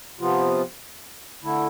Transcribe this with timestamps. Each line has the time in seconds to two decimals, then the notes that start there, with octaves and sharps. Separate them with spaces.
0.19 C3 F3 B3 F4
1.43 D3 A3 E4